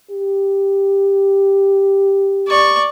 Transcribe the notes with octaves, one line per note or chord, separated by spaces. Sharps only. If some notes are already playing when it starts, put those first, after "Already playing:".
G4
D5 C#6